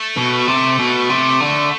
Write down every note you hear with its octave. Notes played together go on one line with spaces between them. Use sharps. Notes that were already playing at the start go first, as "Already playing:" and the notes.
Already playing: A3
B2
C3
B2
C3
D3